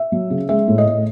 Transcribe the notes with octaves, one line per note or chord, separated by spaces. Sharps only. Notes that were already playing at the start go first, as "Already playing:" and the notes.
Already playing: E5
F#3
C#3
G#3 E5
A2
D#5
A2